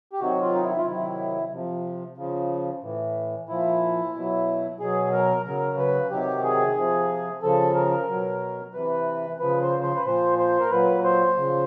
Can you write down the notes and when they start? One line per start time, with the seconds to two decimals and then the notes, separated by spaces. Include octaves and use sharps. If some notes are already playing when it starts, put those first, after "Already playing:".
0.13 G4
0.20 C3 D#3 F#3 F#4
0.41 F4
0.55 D#4
0.63 E4
0.78 F4
0.86 C3 D#3 F#3 E4
1.51 C3 F3
2.17 C#3 F3
2.83 A2 E3
3.49 A#2 F3 E4
4.14 B2 F#3
4.80 B2 F#3 G#4
5.12 A#4
5.46 C#3 F#3 A#4
5.78 B4
6.11 C3 D#3 F#3 G4
6.43 G#4
6.77 C3 F3
7.42 C#3 F3 A4
7.75 A#4
8.08 B2 F#3
8.73 C3 E3 B4
9.39 C#3 F3 B4
9.62 C5
9.83 C5
9.96 B4
10.05 A#2 F3 C5
10.38 C5
10.59 A#4
10.71 A#2 F#3 B4
11.04 C5
11.37 C#3 F3